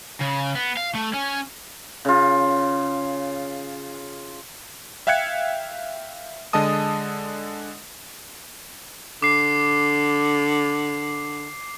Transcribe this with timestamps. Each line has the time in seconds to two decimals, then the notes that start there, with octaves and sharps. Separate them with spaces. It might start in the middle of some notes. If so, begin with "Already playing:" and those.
0.21 C#3
0.55 B3
0.77 F5
0.95 A3
1.14 C#4
2.05 C#3 F4
5.07 E5 F5 G5 F#6 G#6 C#7
6.53 D3 G#3 D#5 A5 D#6
9.22 D3 D6 C7